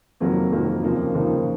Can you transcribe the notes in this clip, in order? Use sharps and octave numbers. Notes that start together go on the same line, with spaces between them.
F2 C3 D#3 F#3 A#3
F2 C3 D#3 F#3 A#3
D#2 C#3 F3 A#3 D#4
D#2 C#3 F3 A#3 D#4